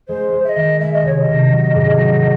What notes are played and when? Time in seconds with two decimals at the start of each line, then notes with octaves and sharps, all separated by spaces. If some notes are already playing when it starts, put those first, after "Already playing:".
0.08 G#3 C5
0.32 G#3
0.44 E5
0.49 D#5
0.56 D#3
0.80 G#3 E5
0.93 D#5
1.03 C3 C#5
1.20 D#5
1.27 C3
1.51 F#3
1.75 G#2
1.97 F#3
2.21 F#3